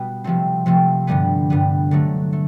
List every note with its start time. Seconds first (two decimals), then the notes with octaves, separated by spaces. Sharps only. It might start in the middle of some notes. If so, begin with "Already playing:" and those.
Already playing: B2 G3 B3
0.24 C3 F3 A3 C4
0.66 C3 F3 A3 C4
1.07 G2 D3 G3 B3
1.50 G2 D3 G3 B3
1.91 D3 F#3 A3
2.33 A3